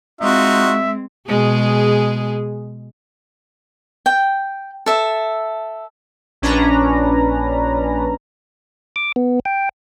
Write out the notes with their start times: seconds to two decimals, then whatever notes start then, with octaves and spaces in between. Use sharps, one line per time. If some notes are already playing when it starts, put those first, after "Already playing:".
0.21 G#3 C4 D#4 F4 F#4 E5
1.28 B2 G#3 G#4
4.06 G5
4.86 A4 E5
6.42 A#1 C#4 D4 B4 A#5
8.96 D6
9.16 B3
9.45 G5